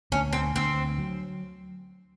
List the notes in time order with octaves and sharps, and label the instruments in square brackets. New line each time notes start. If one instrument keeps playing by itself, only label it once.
[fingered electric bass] D2 [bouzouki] C#4
[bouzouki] C4
[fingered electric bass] D2 [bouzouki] C4
[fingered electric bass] F#3